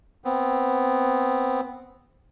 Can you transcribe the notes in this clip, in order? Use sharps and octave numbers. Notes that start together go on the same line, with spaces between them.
B3 C4